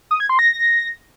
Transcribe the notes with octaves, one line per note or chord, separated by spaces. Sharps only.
D#6
G#6
C6
A#6